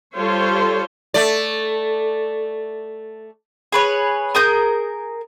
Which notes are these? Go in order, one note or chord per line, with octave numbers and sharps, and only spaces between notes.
G3 F4 A4 C5 C#5
A3 D5
G#4 B4 C#5
G#4 A#4 D#6 G6